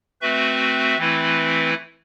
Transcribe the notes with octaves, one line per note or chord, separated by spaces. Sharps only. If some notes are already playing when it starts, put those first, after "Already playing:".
A3 C4 F#4 B4 E5
E3 A3 C4 E4 B4